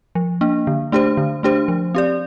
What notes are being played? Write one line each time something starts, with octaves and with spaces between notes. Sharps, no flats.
F3
A#3 D4
D3
A3 D4 G4 C5
D3
A3 D4 G4 C5
F3
C4 G4 D5